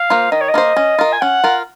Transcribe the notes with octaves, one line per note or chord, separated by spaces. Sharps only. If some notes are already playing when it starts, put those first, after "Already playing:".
Already playing: F5
A#3 F4 C5
D#3 D#5
C#5
D#5
A#3 F4 C5
C#4
F4 A#4
G#5
C#4 F#5
F4 A#4